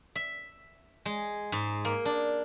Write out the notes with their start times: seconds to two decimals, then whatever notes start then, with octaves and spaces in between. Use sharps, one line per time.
0.15 E5
1.05 G#3
1.52 G#2
1.85 A#3
2.05 D4